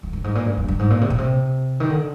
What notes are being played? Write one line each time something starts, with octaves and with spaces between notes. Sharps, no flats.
F2
G2
G#2
A#2
G2
F2
G2
G#2
A#2
C3
A#2
C3
D#3
D3